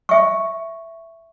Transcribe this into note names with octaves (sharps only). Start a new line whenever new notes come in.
E5 C#6